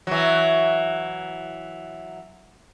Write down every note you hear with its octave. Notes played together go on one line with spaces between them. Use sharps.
E3 F#3